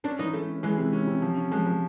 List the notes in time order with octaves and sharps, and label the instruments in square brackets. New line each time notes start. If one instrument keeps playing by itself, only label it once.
[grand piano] C#4 [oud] D4
[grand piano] E3 [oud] D#4
[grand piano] G#3 [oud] A3
[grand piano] C#4
[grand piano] E3 [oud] G#3
[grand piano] C3
C#4
C3
F3
C#4
[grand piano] F3 [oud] G#3
[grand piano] F3